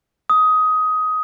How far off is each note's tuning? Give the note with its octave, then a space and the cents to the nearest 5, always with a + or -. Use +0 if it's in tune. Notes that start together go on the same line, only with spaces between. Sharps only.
D#6 +15